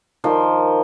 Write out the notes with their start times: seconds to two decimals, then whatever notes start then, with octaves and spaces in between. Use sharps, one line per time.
0.24 D#3 F3 C5